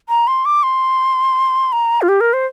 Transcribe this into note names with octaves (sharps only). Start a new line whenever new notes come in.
A#5
C6
D6
C6
A#5
F4
G4
A#4
C5